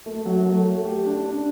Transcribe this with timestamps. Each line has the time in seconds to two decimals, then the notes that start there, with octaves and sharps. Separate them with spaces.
0.06 A3
0.25 F#3
0.45 A3
0.65 A3
0.85 G4
1.05 D4
1.24 D4